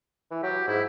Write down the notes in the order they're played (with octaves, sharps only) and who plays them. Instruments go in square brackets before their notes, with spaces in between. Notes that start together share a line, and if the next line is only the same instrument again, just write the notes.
[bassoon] E3
[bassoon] F#3 [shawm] G4
[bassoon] G#2 [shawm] E4